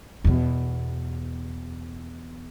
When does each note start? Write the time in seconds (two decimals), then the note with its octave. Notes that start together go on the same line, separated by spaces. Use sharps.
0.24 E2 B2